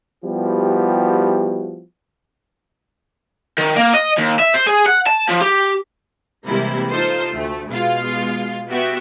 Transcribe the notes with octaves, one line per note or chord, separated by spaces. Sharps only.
F3 G3 B3 E4 F#4 G4
D#3
A#3
D#5
D#2
E5
C5
G#4
F#5
A5
F3
G4
C3 E3 G3 G#3 A#3 E4
D#4 F4 A4 C5
D2 A3
B2 G#3 F4
B3 F#4 G4 E5